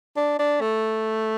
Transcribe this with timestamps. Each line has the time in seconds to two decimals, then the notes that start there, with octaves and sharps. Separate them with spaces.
0.17 D4
0.39 D4
0.61 A3